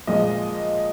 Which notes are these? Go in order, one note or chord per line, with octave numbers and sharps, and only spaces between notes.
A#2 F3 G#3 D#5